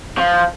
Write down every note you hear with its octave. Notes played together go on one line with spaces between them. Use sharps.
F3